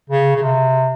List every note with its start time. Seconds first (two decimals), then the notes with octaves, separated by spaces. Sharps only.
0.10 C#3
0.36 C#3
0.42 C3